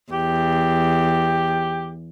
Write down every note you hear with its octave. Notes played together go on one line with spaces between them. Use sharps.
E2 G4